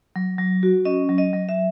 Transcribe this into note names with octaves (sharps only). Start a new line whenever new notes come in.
F#3
F#3
F#4
C#4 D#5
F#3
D#5
F#3
E5